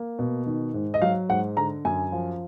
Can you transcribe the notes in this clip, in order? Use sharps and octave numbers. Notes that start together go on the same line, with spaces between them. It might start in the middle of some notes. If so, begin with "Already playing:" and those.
Already playing: A#3
B2
D#3
G#2
D#5
F#3 F5
G#2 F#5
D3 A#5
F#2 G#5
F3